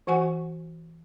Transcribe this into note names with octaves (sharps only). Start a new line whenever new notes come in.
E3 F#4 F#5 G#5 C#6